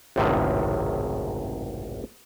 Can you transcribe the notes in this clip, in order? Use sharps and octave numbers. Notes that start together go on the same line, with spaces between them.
G#1 C#2 F#2 A2 C3 D#3